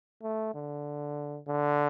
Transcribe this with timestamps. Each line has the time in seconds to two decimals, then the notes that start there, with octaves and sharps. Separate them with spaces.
0.23 A3
0.54 D3
1.48 D3